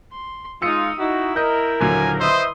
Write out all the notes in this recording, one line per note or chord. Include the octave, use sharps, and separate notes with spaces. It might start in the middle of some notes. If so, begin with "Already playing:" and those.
C6
G#3 D#4 F4 D#6 E6 C#7
D#4 E4 F#4
A#4 D#5 G6
D#1 D3 F#3 G#5
B4 C5 D#5 E5 C6 D#6